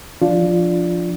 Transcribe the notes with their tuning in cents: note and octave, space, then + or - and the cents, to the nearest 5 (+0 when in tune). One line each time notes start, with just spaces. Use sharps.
F3 +0 D4 +0 F4 +0